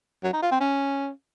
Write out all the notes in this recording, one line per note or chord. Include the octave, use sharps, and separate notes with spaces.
F#3
D#4
F4
C4
C#4